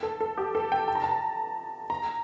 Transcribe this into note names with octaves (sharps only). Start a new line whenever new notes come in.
A4
A4
G4
A4
G5
A5
A#5
A5
A#5